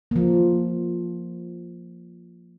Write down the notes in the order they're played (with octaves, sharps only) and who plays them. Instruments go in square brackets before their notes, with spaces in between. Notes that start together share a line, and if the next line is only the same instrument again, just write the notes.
[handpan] F3 A#3